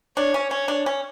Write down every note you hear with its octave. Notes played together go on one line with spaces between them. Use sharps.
D4 C#5
C#4
C#4 C#5
D4
C#4